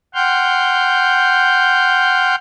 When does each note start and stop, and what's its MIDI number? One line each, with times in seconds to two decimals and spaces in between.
0.14 2.35 78
0.14 2.35 79
0.14 2.35 84
0.14 2.35 89
0.14 2.35 91